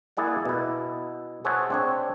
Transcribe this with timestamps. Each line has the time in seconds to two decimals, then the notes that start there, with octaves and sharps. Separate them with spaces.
0.17 A#3 E4 G#4 D5 F#5
0.45 B2 E4
1.45 G#4 C5 C#5 E5 F#5 A5
1.70 C4 D4 C#5